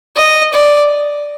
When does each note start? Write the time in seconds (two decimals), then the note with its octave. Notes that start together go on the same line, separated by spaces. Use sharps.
0.16 D#5
0.53 D5